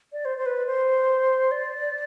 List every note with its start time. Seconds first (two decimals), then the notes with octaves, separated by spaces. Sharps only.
0.13 D5
0.25 C5
0.38 C5
0.46 B4
0.67 C5
1.51 D5